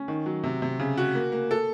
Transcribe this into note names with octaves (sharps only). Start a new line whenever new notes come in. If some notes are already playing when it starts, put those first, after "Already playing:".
Already playing: C#4
D#3
F#3
C3
C3
C#3
F#4
A#3
A#3
A4